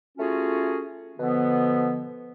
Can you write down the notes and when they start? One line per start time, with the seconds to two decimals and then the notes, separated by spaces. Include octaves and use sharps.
0.17 A3 C#4 F4 F#4 G#4
1.17 B2 D3 F3 B3